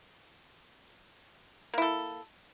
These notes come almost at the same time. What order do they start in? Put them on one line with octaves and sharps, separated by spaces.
A#3 E4 A4